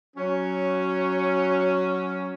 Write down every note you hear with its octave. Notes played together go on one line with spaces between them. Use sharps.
F#3 C#4